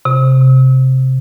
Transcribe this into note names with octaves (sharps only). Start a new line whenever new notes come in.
C3